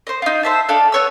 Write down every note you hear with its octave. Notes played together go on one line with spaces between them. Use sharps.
C5 D#5
D#4 F4
C5 E5 A5
D4 A4 F5
B3 C#5 E6